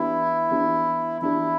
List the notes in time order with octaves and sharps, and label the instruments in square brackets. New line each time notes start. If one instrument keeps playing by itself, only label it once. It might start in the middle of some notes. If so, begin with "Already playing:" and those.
Already playing: [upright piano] E3 B3 D4 G4 [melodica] E4
[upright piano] E3 B3 D4 G4
[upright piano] E3 B3 D4 G4 [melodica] E4